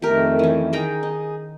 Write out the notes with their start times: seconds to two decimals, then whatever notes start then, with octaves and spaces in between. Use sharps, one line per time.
0.02 F2 D#3 A3 G4 A#4
0.39 E3 C#4
0.73 D#3 G#4 G5 A#5
1.03 D#4